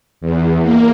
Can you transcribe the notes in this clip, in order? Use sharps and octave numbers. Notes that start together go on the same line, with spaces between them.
E2
A#3